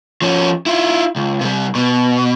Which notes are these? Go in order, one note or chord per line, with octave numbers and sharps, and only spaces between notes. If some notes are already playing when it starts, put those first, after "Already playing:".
F3 C#4
E4 F4
C#2
C3 G3
B2